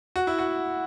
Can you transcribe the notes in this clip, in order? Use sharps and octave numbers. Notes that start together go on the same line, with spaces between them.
F#4
E4
F#4